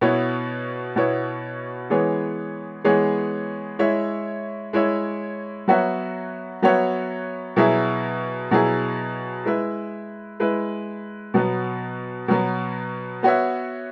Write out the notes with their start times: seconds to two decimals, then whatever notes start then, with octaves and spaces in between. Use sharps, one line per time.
0.01 B2 B3 E4 C#5
0.96 B2 B3 E4 C#5
1.90 E3 G#3 B3 G#4 C#5
2.84 E3 G#3 B3 G#4 C#5
3.79 G#3 E4 C#5 E5
4.73 G#3 E4 C#5 E5
5.68 F#3 B3 F#4 C#5 E5
6.62 F#3 B3 F#4 C#5 E5
7.56 B2 F#3 E4 G#4 E5
8.51 B2 F#3 E4 G#4 E5
9.45 G#3 E4 B4 E5
10.40 G#3 E4 B4 E5
11.34 B2 F#3 B3
12.28 B2 F#3 B3
13.23 B3 F#4 C#5 E5